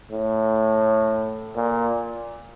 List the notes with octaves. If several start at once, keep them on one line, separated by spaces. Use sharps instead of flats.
A2
A#2